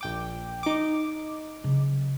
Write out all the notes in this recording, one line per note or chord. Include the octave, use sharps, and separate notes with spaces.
A#1 G5 D6
D#4 D6
C#3 F#3